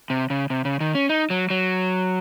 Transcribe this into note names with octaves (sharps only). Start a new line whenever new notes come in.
C3
C#3
C3
C#3
D#3
C#4
D#4
F#3
F#3